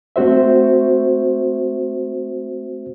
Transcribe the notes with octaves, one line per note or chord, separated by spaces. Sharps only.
A3 C4 F#4 C5 E5